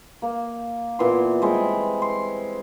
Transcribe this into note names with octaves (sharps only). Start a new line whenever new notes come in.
A#3
A#2 E3 B3 C6
G3 G#3 C4
C6